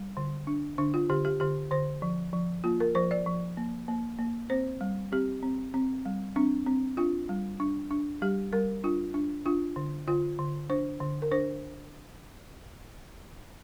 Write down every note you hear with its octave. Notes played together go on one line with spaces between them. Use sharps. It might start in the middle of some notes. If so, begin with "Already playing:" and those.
Already playing: G3
D3
D4
D3 D4
F4
D3 G4
G4
D3 G4
D3 C5
F3
F3
A#3 F4
A#4
F3 C5
D5
F3
A#3
A#3
A#3
C4 C5
G3
C4 G4
C4
C4
G3
C4 D4
C4
D4 F4
G3
D4
D4
G3 G4
G3 A#4
D4 F4
D4
D4 F4
D3
D3 F4
D3
D4 C5
D3
A#4
D4 C5